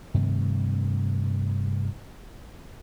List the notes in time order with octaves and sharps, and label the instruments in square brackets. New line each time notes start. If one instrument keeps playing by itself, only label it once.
[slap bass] G2 C3 D#3 A3